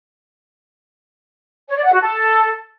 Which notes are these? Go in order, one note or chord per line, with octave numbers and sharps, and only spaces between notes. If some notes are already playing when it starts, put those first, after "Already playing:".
C#5
D5
F#5
F#4
A4